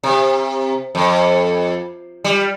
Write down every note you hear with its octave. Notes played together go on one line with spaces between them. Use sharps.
C3
F2
G3